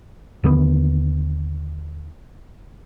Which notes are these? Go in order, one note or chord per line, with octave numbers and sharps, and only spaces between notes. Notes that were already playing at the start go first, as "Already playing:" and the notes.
D#2 D3 G#3 B3